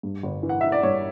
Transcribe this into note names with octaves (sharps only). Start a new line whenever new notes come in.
G2
G1
E3
F#5
E3 E5
D5
G2 C#5